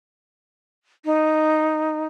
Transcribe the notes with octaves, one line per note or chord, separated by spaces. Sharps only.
D#4